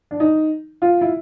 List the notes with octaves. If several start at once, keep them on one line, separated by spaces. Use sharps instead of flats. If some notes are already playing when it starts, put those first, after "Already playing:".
D4
D#4
F4
E4